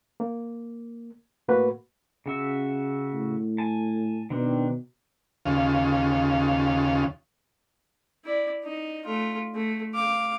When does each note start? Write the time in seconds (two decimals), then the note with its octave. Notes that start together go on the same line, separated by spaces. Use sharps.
0.20 A#3
1.48 A2 A#3 F#4 B4
2.26 C#3 F#4 E5
3.13 A2
3.58 G#5 A5
4.30 B2 D#3 C4 D4
5.46 D#2 C#3 F4
8.25 E4 D5
8.64 D#4
9.05 A3 F4
9.55 A3
9.94 F5 D6